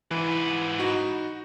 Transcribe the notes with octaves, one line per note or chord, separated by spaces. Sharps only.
G#2 E3 B4
D#4 F#4